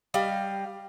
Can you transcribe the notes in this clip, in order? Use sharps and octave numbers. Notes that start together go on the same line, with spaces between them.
G3 D#5 F5